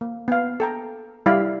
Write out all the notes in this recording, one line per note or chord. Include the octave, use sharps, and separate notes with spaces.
A#3
B3 F5
A4 G5 A#5
G3 E4 D5 F5 B5